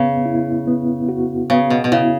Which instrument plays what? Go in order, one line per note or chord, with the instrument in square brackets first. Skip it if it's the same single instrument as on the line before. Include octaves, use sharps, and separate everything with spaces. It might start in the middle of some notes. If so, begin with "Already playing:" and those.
Already playing: [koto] C#3 [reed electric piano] B3
[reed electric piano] E4
B3
F#4
[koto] C#3 [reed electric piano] B3
[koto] B2
B2
[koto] C#3 [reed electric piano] E4